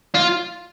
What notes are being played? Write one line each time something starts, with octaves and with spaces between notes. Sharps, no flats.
F4